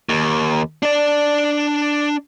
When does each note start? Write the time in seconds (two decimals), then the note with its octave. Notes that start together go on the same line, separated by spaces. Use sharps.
0.09 D#2
0.83 D4 D5